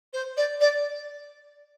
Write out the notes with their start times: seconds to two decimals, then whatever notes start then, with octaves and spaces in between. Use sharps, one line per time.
0.14 C5
0.37 D5
0.61 D5